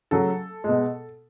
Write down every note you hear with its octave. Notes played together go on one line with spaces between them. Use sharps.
C#3 F#3 A4
B2 G#3